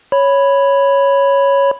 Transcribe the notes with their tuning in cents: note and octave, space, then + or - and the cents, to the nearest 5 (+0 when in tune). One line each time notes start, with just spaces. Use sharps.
C#5 +0 B5 +0